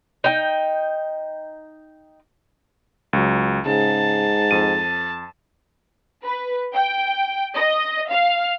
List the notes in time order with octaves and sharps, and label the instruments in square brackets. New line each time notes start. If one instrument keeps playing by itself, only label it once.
[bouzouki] D#4 G5
[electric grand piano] C#2 F#3
[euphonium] G#2 [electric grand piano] C#3 [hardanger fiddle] A5
[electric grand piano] F2 D#7
[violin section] B4
G5
D#5
F5